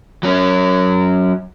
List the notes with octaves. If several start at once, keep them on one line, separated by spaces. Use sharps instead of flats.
F#3 C#4